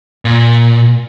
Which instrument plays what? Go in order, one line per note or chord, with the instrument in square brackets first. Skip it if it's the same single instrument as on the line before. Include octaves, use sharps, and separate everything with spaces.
[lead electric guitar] A#2